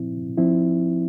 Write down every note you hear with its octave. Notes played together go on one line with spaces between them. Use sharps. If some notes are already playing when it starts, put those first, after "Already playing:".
Already playing: A#2 F3 C4 E4
F3 C4 E4